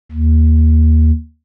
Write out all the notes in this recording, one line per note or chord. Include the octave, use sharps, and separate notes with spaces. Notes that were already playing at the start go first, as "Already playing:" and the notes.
D#2